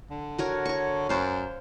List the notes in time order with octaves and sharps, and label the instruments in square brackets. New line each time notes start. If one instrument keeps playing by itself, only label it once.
[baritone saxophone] D3
[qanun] F#4 A#4 C#5
C#5 C#6
[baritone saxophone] F#2 [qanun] C5 F5